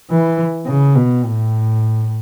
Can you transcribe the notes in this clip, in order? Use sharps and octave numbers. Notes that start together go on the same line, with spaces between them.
E3
C#3
B2
A2